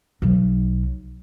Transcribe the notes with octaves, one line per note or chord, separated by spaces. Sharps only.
B1 F#3